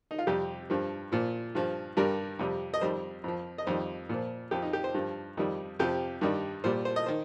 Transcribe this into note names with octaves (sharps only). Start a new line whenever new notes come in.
D#4
F4
F2 C3 G3 G4
G2 F3
A#2 F3
G2 F3
G2 G3 A#4
F2 C3 G3
D#5
F2 D#3 G3 C5
F2 F3
D#5
F2 D#3 G3 C5
A#2 F3
F2 F3 G4
D#4
G4
C5
G2 F3
F2 D#3 G3
F2 C3 F3 G4
G2 D#3 G3
A#2 G3 C5
C5
D#5
D#3 C5